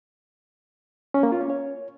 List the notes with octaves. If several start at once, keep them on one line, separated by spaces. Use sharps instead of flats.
C#4
A#3
F4
C#4
C#5